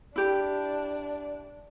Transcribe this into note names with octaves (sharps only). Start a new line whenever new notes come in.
D4 E4 G4